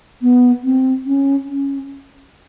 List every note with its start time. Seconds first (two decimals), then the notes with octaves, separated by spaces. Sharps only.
0.22 B3
0.64 C4
1.06 C#4
1.49 C#4